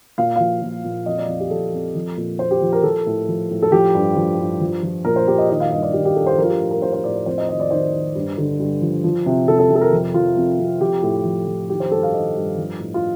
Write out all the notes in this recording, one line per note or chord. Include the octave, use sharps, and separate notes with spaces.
A#2 F5
F3 F5
A#2
A#2
F2 D#5
D5
F2
G4
F2 A4
F2
F3
A#2
A#2 C5
G4
F3
A#4
F3 A4
A2
F3
A2
A4
F3 G4
G2
F3
G2
F3
F3
A#2 A#4
C5
A#2 G4
D#5
D#3 D#5
F5
G2 D#5
D5
D#3 G4
G4
G2 A4
C5
F3 A#4
F4
G4
A2
A#4
A2 C5
C5
A2 D5
D5
F2 C5
D#5
D#3 D#5
D5
D#3 C5
D#3
G2
D3
G2
F3
F3
C3
C3 A4
A4
C3
A4
A#4
F2
F3 F4
F2
F2
F3 G4
A2
F3
F3
D#3 G4
C5
G2 A4
F5
D#3 D#5
G2
F3
A2
F4